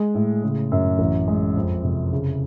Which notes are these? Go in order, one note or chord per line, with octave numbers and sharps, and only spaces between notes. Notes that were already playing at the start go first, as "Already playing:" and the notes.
Already playing: G#3
A2
C#3
F#2
A1
G#3
F2
C3
C#3